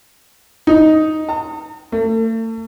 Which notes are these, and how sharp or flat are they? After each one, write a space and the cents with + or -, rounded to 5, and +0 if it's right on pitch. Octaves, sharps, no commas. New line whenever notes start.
D#4 +5
A#5 -45
A3 +40